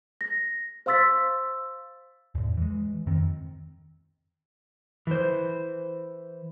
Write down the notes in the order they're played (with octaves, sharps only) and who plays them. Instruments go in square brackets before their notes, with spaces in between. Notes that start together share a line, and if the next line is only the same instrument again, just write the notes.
[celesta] A#6
C5 F5 C6 E6 A6 B6
[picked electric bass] E2 A2
E3 G#3
F2 D#3 C4
[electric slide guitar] E3 C5